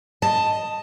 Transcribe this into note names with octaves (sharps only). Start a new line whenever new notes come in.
D#5 A5